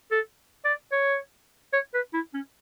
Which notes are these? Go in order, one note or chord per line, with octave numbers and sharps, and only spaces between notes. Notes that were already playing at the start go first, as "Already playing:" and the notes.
A4
D5
C#5
C#5
B4
E4
C#4